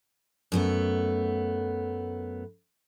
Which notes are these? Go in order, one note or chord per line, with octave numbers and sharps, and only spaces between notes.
F#2 A3 B3